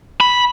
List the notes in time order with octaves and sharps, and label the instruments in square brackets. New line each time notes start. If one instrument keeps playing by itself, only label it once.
[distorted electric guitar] B5